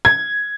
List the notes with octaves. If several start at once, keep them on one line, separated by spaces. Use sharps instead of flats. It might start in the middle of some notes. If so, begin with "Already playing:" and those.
G#6